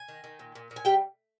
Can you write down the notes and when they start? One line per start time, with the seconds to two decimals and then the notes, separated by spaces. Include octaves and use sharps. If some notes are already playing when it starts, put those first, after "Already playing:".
Already playing: G#5
0.08 D#3
0.24 D#3
0.39 A#2
0.55 A#2
0.71 A#2
0.76 G#5
0.85 G3 G4 G5